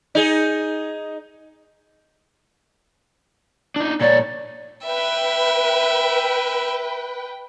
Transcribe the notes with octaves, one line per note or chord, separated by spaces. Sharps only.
D#4 G#4
D4 D#4
A#2 C#5 D5
B4 E5 G5